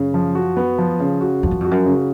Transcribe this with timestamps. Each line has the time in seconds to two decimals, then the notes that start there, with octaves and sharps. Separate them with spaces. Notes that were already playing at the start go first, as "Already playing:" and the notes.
Already playing: F#2 C#3
0.14 F3
0.35 F#4
0.57 B3
0.78 F3
1.00 C#3
1.21 F#4
1.43 F2 F3
1.51 F#2
1.60 F2 F#4
1.71 F#2
1.86 C#3